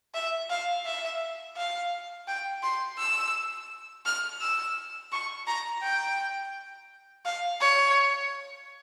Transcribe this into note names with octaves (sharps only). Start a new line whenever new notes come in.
E5
F5
E5
F5
G5
C6
E6
F6
E6
C#6
A#5
G5
F5
C#5